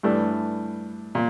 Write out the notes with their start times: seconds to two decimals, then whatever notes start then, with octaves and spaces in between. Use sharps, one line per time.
0.03 G2 E3 A3 D4
1.15 A#2